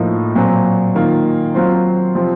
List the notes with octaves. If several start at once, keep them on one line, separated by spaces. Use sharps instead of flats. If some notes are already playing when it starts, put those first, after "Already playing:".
Already playing: A2 F3 A#3 D#4
A#2 F#3 C4
D#3 A#3 F4
F#3 C4 F4 C5
C3 F3 C4